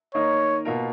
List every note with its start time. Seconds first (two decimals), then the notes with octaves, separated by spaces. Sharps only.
0.14 D#3 A#3 D#4 A#4 C#5 D#5
0.65 B2 A#3 F4 A#4